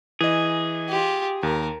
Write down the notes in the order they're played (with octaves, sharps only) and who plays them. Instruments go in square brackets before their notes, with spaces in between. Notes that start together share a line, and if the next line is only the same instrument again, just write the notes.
[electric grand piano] E3 D#5 [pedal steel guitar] G#4
[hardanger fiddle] F4 G4
[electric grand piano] D#2 [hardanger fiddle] A#4